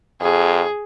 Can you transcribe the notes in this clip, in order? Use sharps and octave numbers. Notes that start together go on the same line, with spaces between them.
F2 G#4